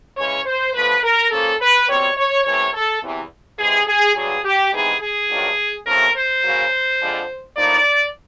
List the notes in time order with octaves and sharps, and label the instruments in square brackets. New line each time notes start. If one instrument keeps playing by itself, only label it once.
[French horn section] C#3 E3 G#3 C#4 C#5
C5
D3 F3 A3 B4
A#4
C#3 F3 A#3 C#4 A4
B4
B2 G3 C4 C#5
C#5
C3 E3 A3 C#4 C#5
A4
E2 C3 E3
C3 E3 G#3 G#4
G#4
G2 D3 F#3 G#4
G4
C3 E3 G#3 B3 D#4 G#4
G#4
G2 D#3 F#3 A#3 D4
C3 F3 A3 C#4 A#4
C5
C#3 F#3 A#3
F2 D3 F3 G#3
A2 F3 A#3 D#4 D5